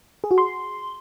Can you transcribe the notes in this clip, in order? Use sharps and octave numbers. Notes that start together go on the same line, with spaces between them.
G#4
F#4
C6